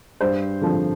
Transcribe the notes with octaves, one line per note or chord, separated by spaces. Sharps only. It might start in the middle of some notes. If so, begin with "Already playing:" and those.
G2 C5
D3 F3 C4